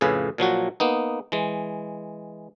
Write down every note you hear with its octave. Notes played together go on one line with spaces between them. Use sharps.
F2 A2 C#3 G#4 B4 F5
A#2 F3 F#3 F#4
A#3 B3 D#4
E3 G#3